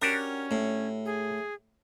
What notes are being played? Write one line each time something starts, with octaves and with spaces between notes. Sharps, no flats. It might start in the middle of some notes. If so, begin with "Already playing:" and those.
C#4 D4 F#4 G4 A#4
A2
G#4